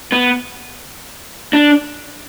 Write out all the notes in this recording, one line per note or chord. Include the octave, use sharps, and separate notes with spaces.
B3
D4